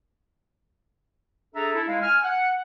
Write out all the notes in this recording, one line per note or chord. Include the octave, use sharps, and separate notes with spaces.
D4 G#4 A4 E5 A#5
E4 A4
G#3 E4 F5
G#5 F6
F#5